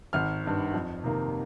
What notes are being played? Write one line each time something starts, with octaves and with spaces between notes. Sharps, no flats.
G#1 F6
G2 D#3
F2
C3 D#3 A#3